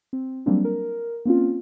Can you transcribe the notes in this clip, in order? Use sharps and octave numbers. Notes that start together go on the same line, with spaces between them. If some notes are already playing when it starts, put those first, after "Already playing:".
C4
F#3 G3 A#3 C4 D4
A#4
A#3 C4 C#4 F4